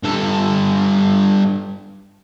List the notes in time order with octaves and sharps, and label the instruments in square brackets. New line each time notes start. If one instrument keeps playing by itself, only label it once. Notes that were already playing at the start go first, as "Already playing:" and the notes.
[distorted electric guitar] G2 A4